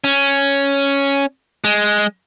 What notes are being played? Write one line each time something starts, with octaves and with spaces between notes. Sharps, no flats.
C#4
G#3